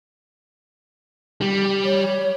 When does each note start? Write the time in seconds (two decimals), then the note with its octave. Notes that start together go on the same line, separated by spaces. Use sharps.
1.41 G3
1.84 C#5